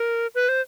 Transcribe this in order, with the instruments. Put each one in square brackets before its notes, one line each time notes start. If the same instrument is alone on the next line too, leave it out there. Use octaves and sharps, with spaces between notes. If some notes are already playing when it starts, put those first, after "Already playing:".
Already playing: [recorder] A#4
B4
C5